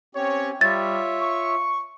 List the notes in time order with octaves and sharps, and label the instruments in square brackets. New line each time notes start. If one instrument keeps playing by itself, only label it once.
[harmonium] C4 C#4 G4 [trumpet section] C#5
[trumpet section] G3 [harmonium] F4 C#5 E5 [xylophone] A6
[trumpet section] C#6